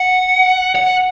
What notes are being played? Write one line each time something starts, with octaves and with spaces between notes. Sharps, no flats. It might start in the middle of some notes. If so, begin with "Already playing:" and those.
Already playing: F#5
F#5